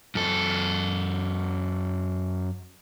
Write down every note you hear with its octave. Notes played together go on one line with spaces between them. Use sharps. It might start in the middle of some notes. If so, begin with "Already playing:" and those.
F#2 A4